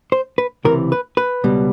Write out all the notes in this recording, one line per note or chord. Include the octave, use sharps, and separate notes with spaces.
C5
B4
C#2 C3 E3 A#4
B4
B4
C#2 B2 G3